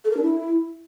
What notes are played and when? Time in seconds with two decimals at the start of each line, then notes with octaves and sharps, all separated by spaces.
0.05 A4
0.11 A#4
0.17 D4
0.23 E4